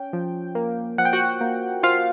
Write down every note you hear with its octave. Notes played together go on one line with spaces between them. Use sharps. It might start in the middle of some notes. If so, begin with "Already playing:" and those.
Already playing: C#4 G5
F3
A#3
F3 F#5
G5
F#4 F#5
A#3
F3 F4 F5